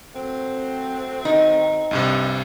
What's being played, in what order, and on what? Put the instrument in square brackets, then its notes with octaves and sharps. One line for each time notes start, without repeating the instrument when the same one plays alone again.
[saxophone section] F#3 A3 C4
[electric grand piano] D#3 [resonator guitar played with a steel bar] D#4
[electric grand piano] C2 G2 C3